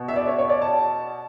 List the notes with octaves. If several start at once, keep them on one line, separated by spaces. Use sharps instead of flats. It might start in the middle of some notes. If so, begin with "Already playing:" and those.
Already playing: B2
E5
D5
C#5
C#5
D5
A5